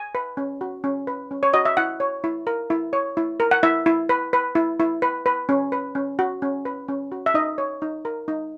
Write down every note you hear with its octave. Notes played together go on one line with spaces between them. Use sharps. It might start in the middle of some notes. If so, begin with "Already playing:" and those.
Already playing: G#5
B4
C#4
F#4
C#4
B4
C#4
C#5
F#4 D#5
E5
E4 F#5
C#5
E4
A#4
E4
C#5
E4
A#4
F#5
E4 E5
E4
B4
B4
E4
E4
B4
B4
C#4
B4
C#4
F#4
C#4
B4
C#4
F#4
E5
D#4 D#5
C#5
D#4
A#4
D#4